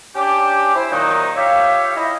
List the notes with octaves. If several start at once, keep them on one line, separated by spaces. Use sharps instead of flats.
C#4 D4 G4
E4 C5
A#2 D#3 F#3 D#4
F4 G4 C#5 E5 F5
E4 D#5